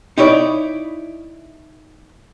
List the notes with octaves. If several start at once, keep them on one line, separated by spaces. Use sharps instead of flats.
D#4 E4 C#5 D5